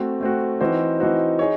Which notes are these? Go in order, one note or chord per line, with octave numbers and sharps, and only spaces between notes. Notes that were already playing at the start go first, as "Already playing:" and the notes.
Already playing: A3 C4 F#4
A3 C4 F#4
E3 C4 D#4 F#4 C5
E3 C4 D#4 F#4 C5
D#4 G#4 C#5